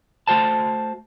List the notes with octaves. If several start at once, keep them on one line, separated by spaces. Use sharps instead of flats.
A3 F#4 C5 A5